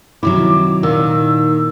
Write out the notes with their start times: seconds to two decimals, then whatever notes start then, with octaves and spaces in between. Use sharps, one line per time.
0.23 C3 D#3 F#3 E4 D6
0.83 A#2 D#3 E6